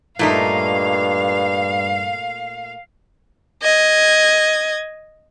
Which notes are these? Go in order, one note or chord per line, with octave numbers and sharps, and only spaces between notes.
G2 A#2 A3 D#4 F5
D#5 G#6